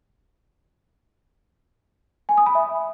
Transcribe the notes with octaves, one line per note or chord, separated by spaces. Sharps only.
G#5
D#6
B5
E5